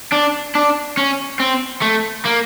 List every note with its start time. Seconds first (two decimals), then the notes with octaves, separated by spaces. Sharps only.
0.13 D4
0.55 D4
0.97 C#4
1.40 C4
1.82 A3
2.25 A#3